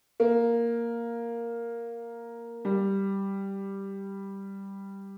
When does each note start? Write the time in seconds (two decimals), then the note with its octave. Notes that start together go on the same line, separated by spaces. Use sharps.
0.20 A#3
2.65 G3